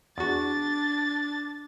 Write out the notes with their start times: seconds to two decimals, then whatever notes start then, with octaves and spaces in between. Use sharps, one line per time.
0.18 E2 D4 F#4 A6